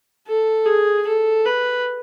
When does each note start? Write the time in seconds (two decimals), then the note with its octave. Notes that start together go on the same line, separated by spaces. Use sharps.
0.27 A4
0.66 G#4
1.07 A4
1.46 B4